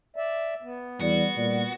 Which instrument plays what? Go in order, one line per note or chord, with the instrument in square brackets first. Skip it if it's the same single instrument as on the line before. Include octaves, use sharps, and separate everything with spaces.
[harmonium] D5 E5
B3
[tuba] E2 [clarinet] G3 [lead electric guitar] F#4
[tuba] A#2 [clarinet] G3